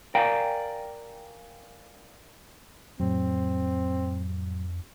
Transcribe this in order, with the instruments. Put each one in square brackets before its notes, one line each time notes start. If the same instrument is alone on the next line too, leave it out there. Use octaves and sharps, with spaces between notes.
[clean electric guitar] A#4 D5 F5 G5 G#5 A#5
[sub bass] F2 [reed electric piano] A2 F#3 [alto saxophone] C4